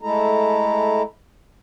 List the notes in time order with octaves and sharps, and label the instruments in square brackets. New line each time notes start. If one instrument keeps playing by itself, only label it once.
[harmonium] G#3 A3 E4 A4 A#5